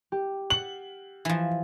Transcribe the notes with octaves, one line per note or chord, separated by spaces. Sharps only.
G4
F#5 F#7
E3 F3